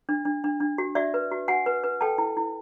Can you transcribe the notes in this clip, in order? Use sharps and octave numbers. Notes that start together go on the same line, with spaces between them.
D4
D4
D4
D4
F#4
F#4 D5 E5
B4
F#4
F#4 F#5 G#5
B4
B4
A4 G5 A5
E4
E4